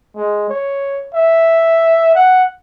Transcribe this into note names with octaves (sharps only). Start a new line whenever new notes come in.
G#3
C#5
E5
F#5